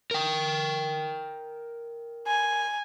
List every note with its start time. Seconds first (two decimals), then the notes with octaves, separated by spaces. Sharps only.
0.11 A#4 G5
2.27 G#5